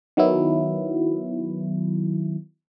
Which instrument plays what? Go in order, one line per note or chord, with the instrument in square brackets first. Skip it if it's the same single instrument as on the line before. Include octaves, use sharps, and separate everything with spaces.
[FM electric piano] D#3 F#3 B3 E4